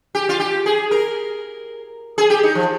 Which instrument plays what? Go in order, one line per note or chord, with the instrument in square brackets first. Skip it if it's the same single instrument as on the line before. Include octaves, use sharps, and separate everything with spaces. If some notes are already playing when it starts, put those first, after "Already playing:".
[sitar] G4
F4
G4
G#4
A#4
G#4
G4
D#4
F3